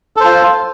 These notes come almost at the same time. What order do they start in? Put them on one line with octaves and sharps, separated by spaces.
A4 C5 F4